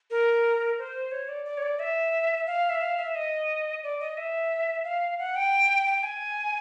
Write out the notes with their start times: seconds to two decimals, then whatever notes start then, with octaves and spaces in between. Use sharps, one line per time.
0.11 A#4
0.79 C5
1.12 C#5
1.29 D5
1.45 D5
1.57 C#5
1.62 D5
1.79 E5
2.47 F5
2.70 E5
2.81 F5
2.98 E5
3.15 D#5
3.84 D5
4.00 D#5
4.17 E5
4.84 F5
5.19 F#5
5.36 G5
5.87 G5
6.03 G#5